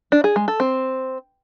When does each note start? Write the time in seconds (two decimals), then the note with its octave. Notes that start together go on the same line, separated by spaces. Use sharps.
0.12 D4
0.24 G#4
0.36 G#3
0.48 A4
0.60 C4